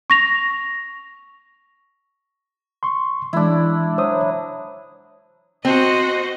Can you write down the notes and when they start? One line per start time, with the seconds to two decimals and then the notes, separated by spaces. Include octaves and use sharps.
0.10 C#6 A#6 F7
2.83 C6 C#6
3.33 E3 G#3 D4 E4
3.98 F#3 C5 D#6
5.65 C4 F#4 C5 D#5